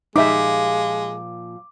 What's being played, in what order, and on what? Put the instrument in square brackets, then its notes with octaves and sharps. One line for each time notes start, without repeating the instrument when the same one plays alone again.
[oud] A#2 F3 G4 [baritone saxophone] G#3 [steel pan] D#4 E5 [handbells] D6